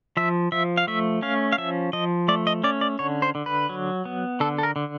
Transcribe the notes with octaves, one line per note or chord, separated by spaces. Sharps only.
F3 E5
F3 E5
F5
A3 E5
C#4 F5
F5
F3 E5
F3 D#5
A3 D5
D#5
C#4 D5
D5
D3 C#5
C5
D3
B4
F#3
B3
D3 A4
A4
A#4
D3